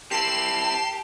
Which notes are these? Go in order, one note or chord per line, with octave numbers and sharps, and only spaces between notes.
C4 E4 G4 A5 C7 E7